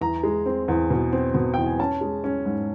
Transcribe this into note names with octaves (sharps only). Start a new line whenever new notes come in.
E2 A#5
G#3
C4
E2
B2
C4
B2
E2 G5
G#5
C#4 A5
G#3
C#4
G#2